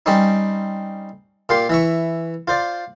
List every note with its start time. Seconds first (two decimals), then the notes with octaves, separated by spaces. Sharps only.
0.06 G3 C4 C#4 D#4
1.49 A#2 F4 G4 C6
1.69 E3 E5 C#6
2.48 F4 C5 D5